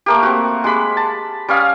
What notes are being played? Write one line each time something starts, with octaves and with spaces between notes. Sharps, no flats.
A3 A#3 G4
C4 F#4
G#3 G4 B5
A5
G3 C#4 F5 D#6